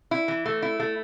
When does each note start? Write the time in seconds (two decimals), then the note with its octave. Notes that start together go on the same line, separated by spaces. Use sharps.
0.11 E4
0.28 E3
0.46 A3
0.62 E4
0.80 A3